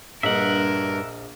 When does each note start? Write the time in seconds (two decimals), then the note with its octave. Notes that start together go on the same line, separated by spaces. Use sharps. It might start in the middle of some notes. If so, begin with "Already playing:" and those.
0.23 A#1 G2 A#4 D#5 E5 F#5